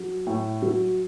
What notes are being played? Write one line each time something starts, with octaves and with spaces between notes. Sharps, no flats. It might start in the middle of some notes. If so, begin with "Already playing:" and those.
Already playing: F#3
A2
F#3